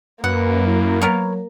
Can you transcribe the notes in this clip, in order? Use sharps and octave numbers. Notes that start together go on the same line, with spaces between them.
F#2 A#3 B4 F#5
E4
F#3 B3 A#4 C#5